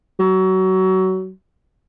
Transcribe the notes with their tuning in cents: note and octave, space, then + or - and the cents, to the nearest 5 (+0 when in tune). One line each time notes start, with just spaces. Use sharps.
F#3 +25